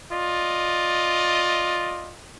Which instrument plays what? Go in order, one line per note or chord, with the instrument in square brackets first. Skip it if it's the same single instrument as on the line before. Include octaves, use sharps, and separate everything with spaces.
[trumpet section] F4 D5 D#5